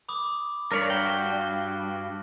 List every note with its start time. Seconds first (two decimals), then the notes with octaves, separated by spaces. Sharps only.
0.09 B5 D6 D#6
0.71 G2 A#4 C#5 D5 F6 B6
0.90 F#4 G5